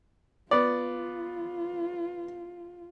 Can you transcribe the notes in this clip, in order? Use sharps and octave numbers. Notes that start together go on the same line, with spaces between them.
B3 F4 D5